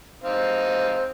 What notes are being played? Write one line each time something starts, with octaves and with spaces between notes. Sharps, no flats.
C4 D#4 F5